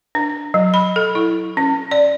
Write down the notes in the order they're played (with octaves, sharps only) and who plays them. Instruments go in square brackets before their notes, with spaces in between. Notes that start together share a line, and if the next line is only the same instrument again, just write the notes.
[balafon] D4
F#3
B5
A4
E4
C#4
D5